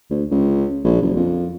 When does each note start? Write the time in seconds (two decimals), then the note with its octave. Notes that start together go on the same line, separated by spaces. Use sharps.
0.10 D2
0.31 C#2
0.84 A#1
1.02 F#1
1.16 F2